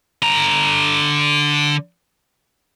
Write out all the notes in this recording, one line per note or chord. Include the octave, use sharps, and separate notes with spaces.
D3 A#5